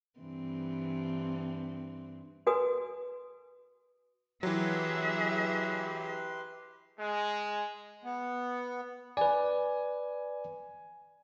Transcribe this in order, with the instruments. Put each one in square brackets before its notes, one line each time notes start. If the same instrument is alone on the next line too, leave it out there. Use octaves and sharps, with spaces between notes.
[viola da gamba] G2 E3 C4
[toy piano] F#4 B4 G#5 D#6
[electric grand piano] E3 F#3 [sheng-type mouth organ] G4 B4 C6 [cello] G#4 E5
[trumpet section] G#3
[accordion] B3
[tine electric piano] B4 D5 [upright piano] G#5